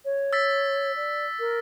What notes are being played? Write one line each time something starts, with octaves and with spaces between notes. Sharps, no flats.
C#5
E6 A6 B6
D5
A#4